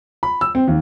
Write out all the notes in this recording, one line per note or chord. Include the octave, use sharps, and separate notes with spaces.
B5
E6
C4
D#2